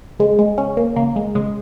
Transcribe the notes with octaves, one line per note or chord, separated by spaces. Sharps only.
C#3 G#3
G#3
C#3 C#4
A#3
C#3 A#3
G#3
C#3 G#3